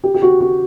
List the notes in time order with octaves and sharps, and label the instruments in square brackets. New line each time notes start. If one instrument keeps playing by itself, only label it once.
[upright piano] G4
G4
F#4
F#4